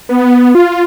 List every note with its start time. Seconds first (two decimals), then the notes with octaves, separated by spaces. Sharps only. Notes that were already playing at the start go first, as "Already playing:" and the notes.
0.09 B3
0.55 F4